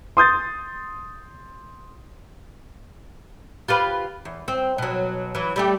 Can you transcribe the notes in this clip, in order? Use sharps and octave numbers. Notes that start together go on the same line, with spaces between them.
C6 D#6 G6 A6
F4 G4 B4
E2
C4
B2 F#3
E3 F#3
G3 A3 G4